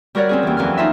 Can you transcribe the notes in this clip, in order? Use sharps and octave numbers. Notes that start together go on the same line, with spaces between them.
G3 F#4 A#4 C#5 D5
C4 C#4 G#4
D#2 E3
F2 E3 F#3 F6
D#4 F4 E5